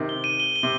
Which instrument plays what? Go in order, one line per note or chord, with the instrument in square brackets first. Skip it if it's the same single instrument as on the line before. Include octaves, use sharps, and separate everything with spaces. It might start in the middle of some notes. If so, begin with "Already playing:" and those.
Already playing: [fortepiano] C3 D#3
[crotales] G7
D#7
G7
G7
[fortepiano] C3